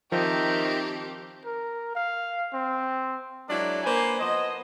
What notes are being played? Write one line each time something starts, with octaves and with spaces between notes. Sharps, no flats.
D#3 F3 C4 G4 E5 G5 A#5
A#4
F5
C4
F#3 G#3 D4 E4 A#4 D5
A#3 D4 B4 C5 G#5
F3 B3 C5 D#5